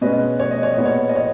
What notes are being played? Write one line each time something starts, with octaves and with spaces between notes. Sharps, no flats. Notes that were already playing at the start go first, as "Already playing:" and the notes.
B2 G#3 C#4 B4 D#5
C#5
D#5
C#5
A#2 G#3 B3 D#5
C#5
D#5
C#5